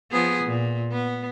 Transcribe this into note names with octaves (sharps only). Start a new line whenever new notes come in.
F3 B3 G#4
A#2
B3